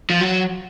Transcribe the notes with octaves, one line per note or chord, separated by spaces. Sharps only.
F3
F#3